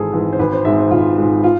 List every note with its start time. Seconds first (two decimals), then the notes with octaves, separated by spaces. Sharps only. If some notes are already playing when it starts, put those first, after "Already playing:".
Already playing: G#1 G#2 E3 G#3 G#4 A4
0.12 G#2 E3 G#3
0.33 C5
0.39 G#1 B4
0.53 C5
0.65 G#2 G#3 E5
0.79 C5
0.91 G#1 F4
1.17 G#3
1.23 G#2
1.44 F4